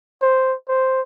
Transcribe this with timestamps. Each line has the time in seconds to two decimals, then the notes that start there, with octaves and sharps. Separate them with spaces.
0.22 C5
0.69 C5